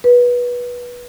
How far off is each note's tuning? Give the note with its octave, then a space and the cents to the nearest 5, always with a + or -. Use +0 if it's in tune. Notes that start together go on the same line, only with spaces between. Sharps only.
B4 -20